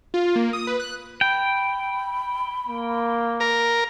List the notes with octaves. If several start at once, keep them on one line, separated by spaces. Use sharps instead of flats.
F4
A#3
D#6
B4
F#6
G5 B5
A#3
A#4